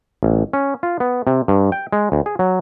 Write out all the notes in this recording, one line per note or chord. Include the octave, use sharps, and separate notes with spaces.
A1
C#4
F4
B3
C3
G2
G5
G#3
D2
G#4
F#3